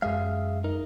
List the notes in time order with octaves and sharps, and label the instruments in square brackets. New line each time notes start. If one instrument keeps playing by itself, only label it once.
[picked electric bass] F#2 G#3 [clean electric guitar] G#4 E5 F5
[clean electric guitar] D#4 A#4